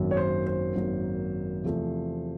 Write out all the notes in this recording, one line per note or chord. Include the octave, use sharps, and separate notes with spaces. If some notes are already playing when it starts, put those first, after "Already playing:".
Already playing: G#1 F#2 D#3 F#3 A#3
C#5
C5
C5
G#1 F#2 D#3 F#3 A#3
E2 C3 F3 A3